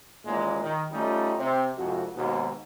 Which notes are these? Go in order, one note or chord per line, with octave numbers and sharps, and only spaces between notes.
D#2 A#2 C#3 E3 G#3
D#3
G3 A3 C#4 D#4 F4
C3 C4
C2 F2 G#2 F#4
D#2 G#2 B2